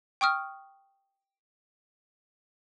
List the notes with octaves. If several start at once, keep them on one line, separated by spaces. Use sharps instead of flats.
G5 C#6 D#6 F6